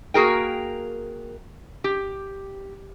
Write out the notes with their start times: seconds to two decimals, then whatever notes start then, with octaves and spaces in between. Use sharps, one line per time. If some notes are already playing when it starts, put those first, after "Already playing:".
0.14 A#3 F#4 G#4 A#4 G5
1.84 G4